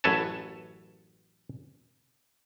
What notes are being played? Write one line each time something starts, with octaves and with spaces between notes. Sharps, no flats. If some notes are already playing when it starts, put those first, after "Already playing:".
A1 F#2 A4 B4 C#5 A5